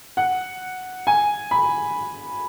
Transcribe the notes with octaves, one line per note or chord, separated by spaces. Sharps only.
F#5
G#5
B5